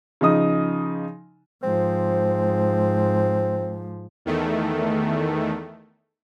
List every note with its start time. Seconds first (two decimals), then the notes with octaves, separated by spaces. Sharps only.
0.21 C#3 F3 D#4 D#6
1.63 G#2 F3 C4
4.25 E2 D#3 A3